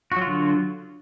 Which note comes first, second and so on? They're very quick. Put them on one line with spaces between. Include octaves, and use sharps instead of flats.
F#4 F#3 F4 D3